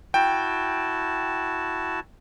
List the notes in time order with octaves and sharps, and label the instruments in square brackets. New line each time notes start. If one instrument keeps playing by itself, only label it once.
[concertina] E4 F#4 A5 [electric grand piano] G5